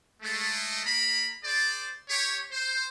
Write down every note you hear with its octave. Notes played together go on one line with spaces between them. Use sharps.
G#3 A3
A#3 A#4 A#5 B5
G#4 C5 D5
G4 C#5
C5